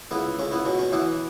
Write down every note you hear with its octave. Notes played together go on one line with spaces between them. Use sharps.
C#2 B3 E4
C#2 C#4
B3 E4
B2 C#4
C#4
E3 B3 E4